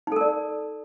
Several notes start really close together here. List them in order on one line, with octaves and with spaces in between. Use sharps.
D#4 A4 A#4 D5